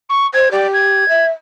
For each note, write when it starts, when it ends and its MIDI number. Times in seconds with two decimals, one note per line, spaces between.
0.09 0.26 85
0.34 0.48 72
0.34 0.49 92
0.51 1.07 67
0.51 0.67 74
0.73 1.25 92
1.08 1.30 76